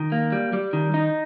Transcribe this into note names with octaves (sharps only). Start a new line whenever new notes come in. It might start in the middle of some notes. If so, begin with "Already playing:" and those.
Already playing: D#3
A#3
G3
G3
D#3
D#4